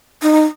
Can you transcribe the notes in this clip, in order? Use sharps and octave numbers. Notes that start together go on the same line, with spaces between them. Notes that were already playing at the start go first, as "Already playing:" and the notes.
D#4